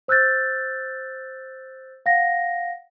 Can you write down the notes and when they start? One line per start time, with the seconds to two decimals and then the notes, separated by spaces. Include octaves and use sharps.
0.08 C5 E6 F#6 G6 A6
2.06 F5 F#5 A#6